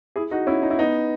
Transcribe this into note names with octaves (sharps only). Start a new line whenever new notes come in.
E4 G#4
D#4 F#4
C#4 E4
D#4
E4
B3 D#4